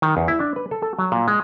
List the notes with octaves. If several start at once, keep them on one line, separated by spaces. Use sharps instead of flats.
D#3
E2
E4
D4
B4
A4
A4
F#3
A#2
G#3